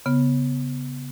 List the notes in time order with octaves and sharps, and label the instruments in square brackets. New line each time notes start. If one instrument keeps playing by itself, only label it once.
[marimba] C#3 B3